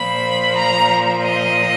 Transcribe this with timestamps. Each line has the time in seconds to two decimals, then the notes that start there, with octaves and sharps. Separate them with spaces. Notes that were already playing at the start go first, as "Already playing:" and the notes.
Already playing: A#2 F3 B5
0.55 A#5
1.23 D#5